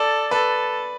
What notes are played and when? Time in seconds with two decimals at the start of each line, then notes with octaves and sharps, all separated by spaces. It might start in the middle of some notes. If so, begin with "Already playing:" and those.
Already playing: A4 D5
0.31 A4 B4